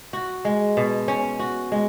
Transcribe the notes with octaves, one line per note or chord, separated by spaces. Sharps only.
F#4
G#3
B2
C#4
F#4
G#3